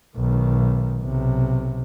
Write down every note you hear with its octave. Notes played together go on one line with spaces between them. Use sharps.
B1 D#3
B1 C3